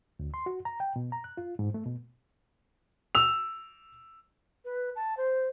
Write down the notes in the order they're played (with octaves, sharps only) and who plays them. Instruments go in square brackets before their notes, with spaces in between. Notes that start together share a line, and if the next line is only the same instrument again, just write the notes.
[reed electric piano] D2
C6
F#4
A#5
G5
B2
A#5
F#6
F4
G#2
A3
B2
[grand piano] E6 F7
[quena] B4
A5
C5